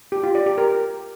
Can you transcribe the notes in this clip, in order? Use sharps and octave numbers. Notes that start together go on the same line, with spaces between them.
G4
F4
D5
G4
A#4